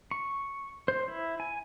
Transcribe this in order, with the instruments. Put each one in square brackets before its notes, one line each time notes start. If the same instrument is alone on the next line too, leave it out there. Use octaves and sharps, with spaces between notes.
[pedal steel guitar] C#6
C5
E4
G#5